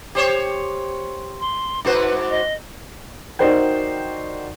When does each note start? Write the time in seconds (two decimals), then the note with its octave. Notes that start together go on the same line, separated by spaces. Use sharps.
0.15 G4 C5 C#5
1.40 C6
1.85 G#2 F#4 B4 C5
2.29 D#5
3.39 D#4 F#4 A#4 C5 D5 G5